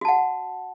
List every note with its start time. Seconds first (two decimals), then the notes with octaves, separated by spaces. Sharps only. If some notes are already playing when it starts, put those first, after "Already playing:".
0.01 F#4
0.05 A5
0.08 F#5